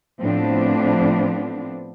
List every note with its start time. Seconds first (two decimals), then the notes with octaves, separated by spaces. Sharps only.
0.22 A2 F3 B3 C4 D4